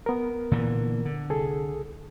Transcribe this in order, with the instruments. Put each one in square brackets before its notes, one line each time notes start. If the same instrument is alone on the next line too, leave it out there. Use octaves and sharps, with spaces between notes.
[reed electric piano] B3 A#4
[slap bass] A#2 D3 E3
D3
[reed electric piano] C2 G#4 A4